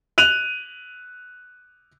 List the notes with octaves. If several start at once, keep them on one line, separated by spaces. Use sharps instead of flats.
F#6 D#7 F7